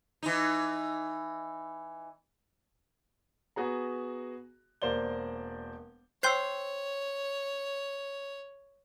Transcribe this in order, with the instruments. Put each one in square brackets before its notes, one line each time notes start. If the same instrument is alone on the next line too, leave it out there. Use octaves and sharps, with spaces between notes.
[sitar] E3 D#4
[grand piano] B3 F#4 G#4 A#5
E1 A#3 C5 D5 G7
[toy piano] C5 G5 E6 [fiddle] C#5 [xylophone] C6 G6 C7